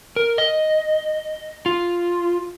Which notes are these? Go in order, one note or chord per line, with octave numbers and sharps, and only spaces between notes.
A#4
D#5
F4